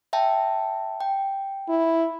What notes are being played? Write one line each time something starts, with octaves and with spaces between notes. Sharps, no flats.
E5 G5 A5
G5
E4